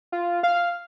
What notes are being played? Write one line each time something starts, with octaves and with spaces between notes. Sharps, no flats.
F4
F5